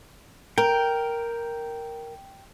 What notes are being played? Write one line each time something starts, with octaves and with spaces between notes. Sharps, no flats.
A#4 G5